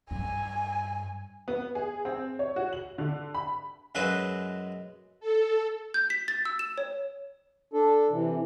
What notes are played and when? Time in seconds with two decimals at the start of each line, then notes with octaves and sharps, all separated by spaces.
0.11 G2 G#5
1.48 B3
1.75 G#4
2.05 C4
2.39 C#5
2.56 F#4
2.73 F#7
2.98 D3
3.34 B5
3.95 F#2 F#3 G#3 E4 B4
5.20 A4
5.94 G6
6.10 B6
6.28 A6
6.45 E6
6.59 E7
6.78 C#5
7.74 D4 A4
8.10 C3 E3